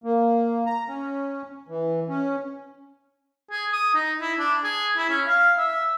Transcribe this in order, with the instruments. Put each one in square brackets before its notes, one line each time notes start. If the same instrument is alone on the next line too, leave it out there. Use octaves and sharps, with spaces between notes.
[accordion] A#3
A#5
C#4
E3
C#4
[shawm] G#4
D#6
D#4
E4
D4
G#4
E4
C#4
F5
E5